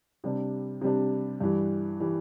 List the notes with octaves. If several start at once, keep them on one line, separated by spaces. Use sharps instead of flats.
C3 G3 D4
C3 G3 D4
G2 E3 G3
E3 G3